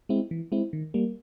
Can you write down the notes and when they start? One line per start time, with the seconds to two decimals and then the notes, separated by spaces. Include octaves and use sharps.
0.09 G#3 C4 E4
0.31 E3
0.52 G#3 C4 E4
0.73 D#3
0.94 G3 A#3